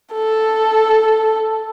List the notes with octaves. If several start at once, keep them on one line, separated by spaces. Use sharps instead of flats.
A4